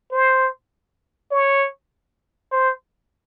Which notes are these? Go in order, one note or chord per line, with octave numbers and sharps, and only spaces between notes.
C5
C#5
C5